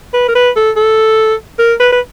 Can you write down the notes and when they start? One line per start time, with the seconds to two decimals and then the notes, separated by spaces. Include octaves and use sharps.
0.14 B4
0.28 A#4
0.35 B4
0.56 A4
0.76 A4
1.59 A#4
1.80 B4
1.92 B4